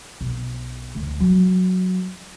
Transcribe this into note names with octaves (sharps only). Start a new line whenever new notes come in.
B1
D2
F#3